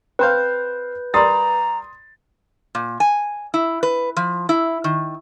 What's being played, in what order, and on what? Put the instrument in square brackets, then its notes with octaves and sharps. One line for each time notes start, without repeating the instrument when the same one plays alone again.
[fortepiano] C4 C5 F5 [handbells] B4 G6
[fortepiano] G3 A#4 D5 [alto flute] A#5 [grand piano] C6 D#6 A6
[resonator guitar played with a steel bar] A#2
G#5
E4
B4
F3
E4
D#3